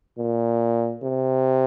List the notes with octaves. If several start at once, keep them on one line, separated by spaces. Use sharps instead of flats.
A#2
C3